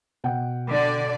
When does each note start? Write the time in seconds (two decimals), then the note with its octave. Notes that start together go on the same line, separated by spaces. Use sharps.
0.24 B2 F#5 G5
0.70 D3 D5